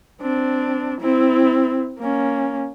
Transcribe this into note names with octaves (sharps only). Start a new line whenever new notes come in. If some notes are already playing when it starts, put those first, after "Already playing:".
C4 D4
C4 E4
A#3 C#4